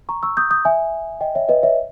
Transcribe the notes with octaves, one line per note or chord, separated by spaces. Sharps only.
A#5 C#6
C#6 E6
D#6 G6
D#6 G6
E5 G#5
D#5 G5
C#5 E5
B4 D#5
C#5 E5